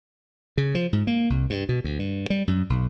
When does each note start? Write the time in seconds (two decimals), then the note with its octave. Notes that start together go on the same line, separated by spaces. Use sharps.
0.58 C#3
0.75 F3
0.93 G#2
1.07 A#3
1.30 C2
1.50 G2
1.69 B2
1.84 D2
1.99 G2
2.30 G3
2.48 F#2
2.70 B1